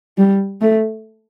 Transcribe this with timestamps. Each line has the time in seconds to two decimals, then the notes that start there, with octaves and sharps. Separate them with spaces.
0.18 G3
0.61 A3